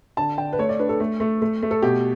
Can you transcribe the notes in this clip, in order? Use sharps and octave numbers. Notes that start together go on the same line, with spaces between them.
D3 A5
D3 G5
B4
A3 C#5
D5
D4 B4
A4
A3
A3
A3
A3
A4
B2 G4